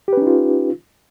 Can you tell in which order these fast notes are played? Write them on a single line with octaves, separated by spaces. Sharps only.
G4 B4 C#4 D#4 F4